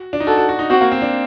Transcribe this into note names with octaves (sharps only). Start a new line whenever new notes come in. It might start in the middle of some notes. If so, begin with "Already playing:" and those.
Already playing: F#4
D4
D#4
F#4 A4
F#4
F#4
D#4
C4 F#4
A#3
C4
D4